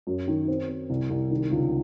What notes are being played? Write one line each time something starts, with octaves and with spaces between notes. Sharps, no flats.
F#2
D#3
C4
C4
C2
C2
D#3
C#2